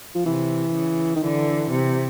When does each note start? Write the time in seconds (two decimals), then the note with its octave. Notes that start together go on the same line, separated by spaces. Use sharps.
0.15 F3
0.26 C3 E3
0.75 C#3
1.16 D#3
1.23 D3 E3
1.71 C3